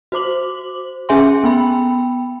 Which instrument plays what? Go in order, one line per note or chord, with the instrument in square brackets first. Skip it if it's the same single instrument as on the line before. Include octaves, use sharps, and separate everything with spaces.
[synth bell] F#4 C5 D6 F#7
C#4 G#4 E5 G#5 C6
B3 G5 B5